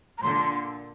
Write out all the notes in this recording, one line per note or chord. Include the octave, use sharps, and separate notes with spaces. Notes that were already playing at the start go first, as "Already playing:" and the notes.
A#5
A#2 D3 C6
C6